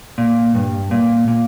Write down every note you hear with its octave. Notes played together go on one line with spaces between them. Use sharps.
A#2
G2
A#2
A#2